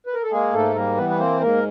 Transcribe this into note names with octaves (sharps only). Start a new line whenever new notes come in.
B4
A#4
A4
G#3 A#3 G#4
G#2 A3 A4
G3 A#3 A#4
E3 B3 B4
B4
A#3 C4 C5
G#2 A#3 A#4